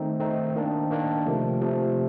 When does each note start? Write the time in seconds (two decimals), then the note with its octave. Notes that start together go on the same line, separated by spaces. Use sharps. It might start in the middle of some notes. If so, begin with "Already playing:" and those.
Already playing: D#3 A3 C4 D#4
0.20 D#3 A3 C4 D#4
0.56 D#3 A#3 D4
0.91 D#3 A#3 D4
1.26 C3 F3 A3
1.61 C3 F3 A3